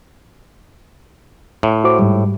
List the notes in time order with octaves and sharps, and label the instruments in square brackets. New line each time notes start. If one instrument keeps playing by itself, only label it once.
[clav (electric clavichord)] A2
[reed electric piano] F#4 C5 D6
G#2 G3